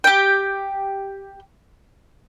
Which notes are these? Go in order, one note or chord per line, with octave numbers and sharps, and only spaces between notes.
G4 G5